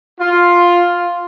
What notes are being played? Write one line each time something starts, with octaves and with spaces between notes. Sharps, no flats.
F4